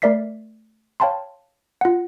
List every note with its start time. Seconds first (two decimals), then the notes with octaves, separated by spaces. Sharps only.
0.02 A3 A#4 D5 E5 B6 C7
1.00 C#5 F5 G5 A5 B5 C6
1.81 F4 F#5